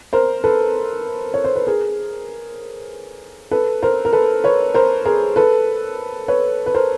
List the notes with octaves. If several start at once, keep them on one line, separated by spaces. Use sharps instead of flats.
A#4 C5
A4 B4
C#5
C5
B4
G#4 A#4
A4 B4
A#4 C5
A#4
A4 B4
B4 C#5
A#4 C5
G#4 A#4
A4 B4
B4 C#5
B4
A#4 C5